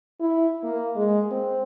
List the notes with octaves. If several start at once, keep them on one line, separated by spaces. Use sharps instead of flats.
E4
A#3
G#3
C4